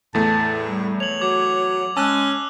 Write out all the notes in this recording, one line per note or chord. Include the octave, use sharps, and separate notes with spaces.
E2 A2 A3 A5
G3
C#5 F7 F#7
F#3 D6 G#6
G#3 C#4 A5 E6 F#6